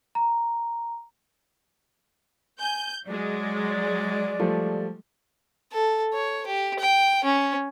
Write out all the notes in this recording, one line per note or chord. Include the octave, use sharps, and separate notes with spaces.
A#5
G#5 G6
F#3 G#3 D5
F3 G3 A3
A4
C#5
G4
G5
C#4